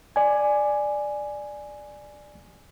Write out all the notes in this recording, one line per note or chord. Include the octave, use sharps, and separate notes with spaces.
D5 G#5